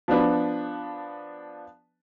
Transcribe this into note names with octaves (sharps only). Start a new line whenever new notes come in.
F3 B3 D4 B4